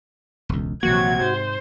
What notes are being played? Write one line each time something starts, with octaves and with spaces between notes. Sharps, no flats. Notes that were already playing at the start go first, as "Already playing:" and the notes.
E1 C#2
A#1 C3 E3 F#3 A#3 F#4 G#6
G#2 C5